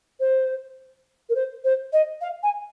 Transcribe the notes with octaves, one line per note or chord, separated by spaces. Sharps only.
C5
A#4
C5
C5
D#5
F5
G#5